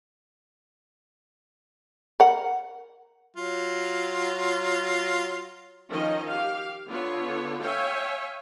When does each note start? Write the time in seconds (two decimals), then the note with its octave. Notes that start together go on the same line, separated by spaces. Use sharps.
2.20 A#4 F#5
3.37 F#3 F4
5.91 D#3 F3 C#4 D#5
6.29 G4 F5
6.88 D3 B3 F4 C#5
7.63 C#5 E5 F5 G5 G#5